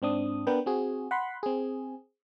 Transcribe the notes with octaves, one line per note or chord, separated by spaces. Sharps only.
G#2 C4 D4 D#6
B3 D4 A#4 B4 G5
C4 F#4 G#4
F#5 B5 C6
C4 G#4